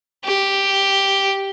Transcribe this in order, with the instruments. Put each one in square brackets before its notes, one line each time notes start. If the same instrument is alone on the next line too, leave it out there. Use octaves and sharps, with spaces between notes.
[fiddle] G4